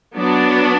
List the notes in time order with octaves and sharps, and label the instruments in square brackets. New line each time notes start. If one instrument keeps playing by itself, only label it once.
[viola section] F#3 B3 D4